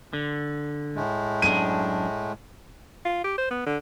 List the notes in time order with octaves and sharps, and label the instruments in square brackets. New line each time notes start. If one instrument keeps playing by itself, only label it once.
[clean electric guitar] D3
[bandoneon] A2 G#3 A3
[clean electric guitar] F#2 D4 [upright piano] D#7
[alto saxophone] F4
G4
C5
B3
D3